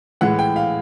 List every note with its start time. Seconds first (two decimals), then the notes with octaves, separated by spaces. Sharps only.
0.21 A2 E3 G#3 F#5
0.39 G5
0.56 F5